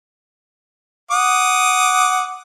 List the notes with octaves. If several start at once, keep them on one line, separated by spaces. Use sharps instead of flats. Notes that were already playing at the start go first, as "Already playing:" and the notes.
F#5 D6 D#6